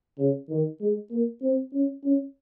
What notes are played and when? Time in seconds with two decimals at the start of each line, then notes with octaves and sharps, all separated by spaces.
0.18 C#3
0.50 D#3
0.81 G#3
1.11 A#3
1.42 C4
1.73 C#4
2.04 C#4